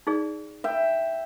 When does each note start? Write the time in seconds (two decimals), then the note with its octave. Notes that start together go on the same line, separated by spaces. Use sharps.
0.07 D#4 G#4 D5
0.64 E5 G5